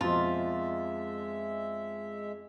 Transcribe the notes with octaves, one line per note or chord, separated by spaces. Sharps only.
F2 B2 F3 G#3 F4 E5